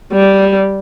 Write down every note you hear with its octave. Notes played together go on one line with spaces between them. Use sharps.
G3